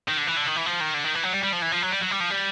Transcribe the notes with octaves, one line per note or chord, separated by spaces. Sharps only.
D#3
D3
E3
D3
D#3
E3
F3
D#3
D3
D#3
E3
F#3
G3
G3
F3
E3
F3
F#3
G3
F#3
G3
F3
G3